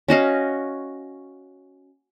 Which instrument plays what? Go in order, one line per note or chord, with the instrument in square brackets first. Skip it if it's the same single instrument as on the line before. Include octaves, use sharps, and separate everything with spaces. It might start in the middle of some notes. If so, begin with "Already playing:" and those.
[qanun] C#4 F#4 D#5 F5